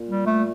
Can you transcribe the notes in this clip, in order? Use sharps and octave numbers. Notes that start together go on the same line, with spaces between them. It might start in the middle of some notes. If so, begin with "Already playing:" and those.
Already playing: A#2
G3
A3